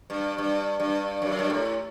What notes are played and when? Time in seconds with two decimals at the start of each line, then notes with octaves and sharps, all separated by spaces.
0.10 G2
0.38 G2
0.80 G2
1.22 F#2
1.39 G2
1.50 A2